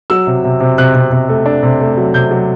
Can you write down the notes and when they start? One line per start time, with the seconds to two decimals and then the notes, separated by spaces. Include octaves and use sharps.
0.10 F#3 E6
0.27 C3
0.44 C3
0.60 C3
0.78 C3 F#6
0.95 C3
1.12 C3
1.29 A3
1.46 D4
1.63 C3
1.80 A3
1.97 F#3
2.14 C3 G6
2.31 F#3